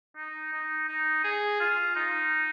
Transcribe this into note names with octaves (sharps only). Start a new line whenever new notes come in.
D#4
D#4
D#4
G#4
F4
D#4